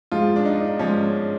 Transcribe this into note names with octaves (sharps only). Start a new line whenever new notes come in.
G#2 F3 G#3 F4
D4
D#4
G#2 F3 G#3 C#4